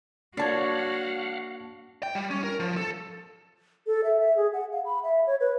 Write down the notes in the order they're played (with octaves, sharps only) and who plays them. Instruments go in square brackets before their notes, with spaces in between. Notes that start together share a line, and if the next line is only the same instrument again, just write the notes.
[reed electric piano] A#3 A5 G#6 [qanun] D4 C#5 [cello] F#4 [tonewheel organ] F5 F#5
[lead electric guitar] G5
G3
C#4
A#4
F3
A4
[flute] A4
E5
E5
G#4
F#5
F5
B5
E5
C#5
B4